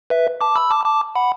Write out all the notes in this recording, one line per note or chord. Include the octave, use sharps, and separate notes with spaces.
B4 E5
A5 D6
B5 E6
A5 D6
A5 D6
F#5 B5